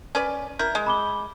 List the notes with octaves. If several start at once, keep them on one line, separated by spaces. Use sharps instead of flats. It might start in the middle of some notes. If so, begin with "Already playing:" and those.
C#4 B4 D5
E4 A#4 G6
G#3
B5 D6 G7